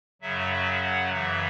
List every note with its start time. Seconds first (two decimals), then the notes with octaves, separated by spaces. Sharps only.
0.22 F#2 C#3 F#3 E5
0.52 E5
0.82 F#5
1.13 F#2 C#3 E3 E5